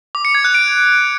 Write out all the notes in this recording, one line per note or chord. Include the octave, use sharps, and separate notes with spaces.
D6
C#7
G#6
F#6
D7